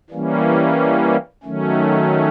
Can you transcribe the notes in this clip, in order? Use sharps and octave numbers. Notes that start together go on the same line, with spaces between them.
E3 G3 A#3 C#4
D#3 F#3 A3 C#4